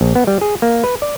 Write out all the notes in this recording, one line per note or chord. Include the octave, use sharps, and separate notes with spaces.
A#1
B3
G3
G#4
A#3
B4
D5